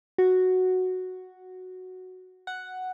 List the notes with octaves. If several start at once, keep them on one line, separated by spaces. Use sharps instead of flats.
F#4
F#5